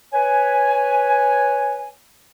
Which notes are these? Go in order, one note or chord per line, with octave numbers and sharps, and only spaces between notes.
B4 C#5 G#5